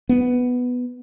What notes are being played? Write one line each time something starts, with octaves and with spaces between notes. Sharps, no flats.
B3